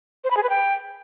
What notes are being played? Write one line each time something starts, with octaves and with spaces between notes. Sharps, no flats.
C5
B5
G#4
B4
G5